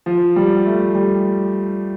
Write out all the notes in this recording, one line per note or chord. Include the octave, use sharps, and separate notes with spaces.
F3
G3
A3
G3